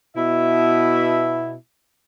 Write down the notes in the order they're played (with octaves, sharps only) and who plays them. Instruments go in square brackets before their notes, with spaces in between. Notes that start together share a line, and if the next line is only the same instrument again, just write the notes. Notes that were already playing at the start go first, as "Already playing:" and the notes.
[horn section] B2 E4 E5